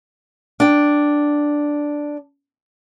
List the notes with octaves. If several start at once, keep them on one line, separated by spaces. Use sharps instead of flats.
D4 G5